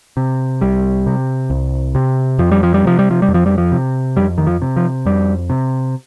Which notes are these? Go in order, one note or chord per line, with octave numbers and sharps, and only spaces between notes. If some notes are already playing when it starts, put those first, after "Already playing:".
C3
C2 G3
C3
C2
C3
F2 F3
G3
F3
G3
C3 F3
G3
F3
G3
F2
F3
G3
F3
C3
F2 G3
D#3
F3
C3
F3
F2 G3
C3